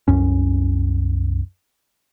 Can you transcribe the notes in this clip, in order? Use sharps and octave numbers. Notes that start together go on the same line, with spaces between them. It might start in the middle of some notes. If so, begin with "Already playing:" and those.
C2 F#2 C#4